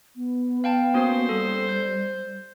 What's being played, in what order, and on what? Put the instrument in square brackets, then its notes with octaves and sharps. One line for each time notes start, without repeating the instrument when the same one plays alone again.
[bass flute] B3
[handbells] F5 G5 A5
[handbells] A#3 C#4 F#4 [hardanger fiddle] C5
[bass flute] G3 [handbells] A4
[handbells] G6